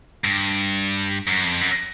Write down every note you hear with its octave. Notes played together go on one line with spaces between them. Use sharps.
G2
F#2
F2
F#2